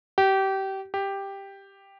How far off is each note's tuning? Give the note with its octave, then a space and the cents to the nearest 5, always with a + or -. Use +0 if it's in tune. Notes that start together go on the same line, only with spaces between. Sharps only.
G4 -25
G4 +5